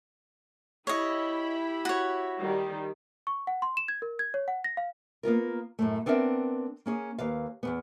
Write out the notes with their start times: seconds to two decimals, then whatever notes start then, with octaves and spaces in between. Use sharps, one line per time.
0.87 E4 G4 C#5 D#5 B5
1.85 F#4 C#5
2.38 D#3 G3
3.27 C#6
3.47 F#5
3.62 C6
3.77 E7
3.88 G#6
4.02 A#4
4.19 G#6
4.34 C#5
4.48 F#5
4.64 A#6
4.77 F5
5.23 A#3 B3 F4 A#4
5.79 F#2 A2 A3
6.06 B3 C4 D4 A#4 E5
6.86 A#3 C#4 G#4
7.18 D#2 B4 F5
7.63 E2 G#2 B3